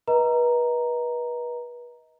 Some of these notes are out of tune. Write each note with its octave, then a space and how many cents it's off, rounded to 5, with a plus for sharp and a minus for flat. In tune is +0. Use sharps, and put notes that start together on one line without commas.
B4 -30 D#5 +25 A#5 +0